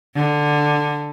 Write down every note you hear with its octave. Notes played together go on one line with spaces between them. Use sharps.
D3